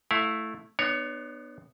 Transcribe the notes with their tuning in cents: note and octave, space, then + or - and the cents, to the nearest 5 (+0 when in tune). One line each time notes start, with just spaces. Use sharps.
A3 +0 E4 +0 F5 +25
B3 +0 D4 +45 C#5 +10